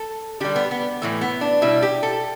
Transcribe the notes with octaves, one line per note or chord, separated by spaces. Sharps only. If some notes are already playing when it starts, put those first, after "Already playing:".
Already playing: A4
D3 G3 G4
B3
B3
A2 E3 A3
B3
D4
B2 G3 E4
G4
A4